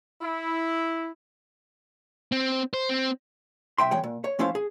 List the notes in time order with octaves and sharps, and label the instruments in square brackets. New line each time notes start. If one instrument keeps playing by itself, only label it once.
[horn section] E4
[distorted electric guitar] C4
C5
C4
[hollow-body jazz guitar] B1 E5 G5 C6
E2 A2 G#3 C#5 G5
A#2
C#5
F3 A3 C#4 E4 C5 F5
G#4